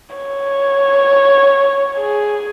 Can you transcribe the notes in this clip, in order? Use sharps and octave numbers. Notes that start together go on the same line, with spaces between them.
C#5
G#4